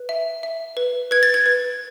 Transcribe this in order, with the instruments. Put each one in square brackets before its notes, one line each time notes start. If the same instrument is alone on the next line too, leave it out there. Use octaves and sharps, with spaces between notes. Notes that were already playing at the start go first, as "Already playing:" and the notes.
Already playing: [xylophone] B4
E5
E5
B4
B4 G#6
A6
G#6
B4